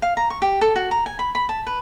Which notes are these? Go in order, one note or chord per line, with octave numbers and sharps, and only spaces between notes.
F5
A#5
C#6
G4
A4
F#4
A#5
G#5
B5
B5
A5
B4